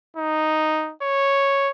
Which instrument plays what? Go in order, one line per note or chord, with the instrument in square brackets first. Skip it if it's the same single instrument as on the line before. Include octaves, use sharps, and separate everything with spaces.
[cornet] D#4
C#5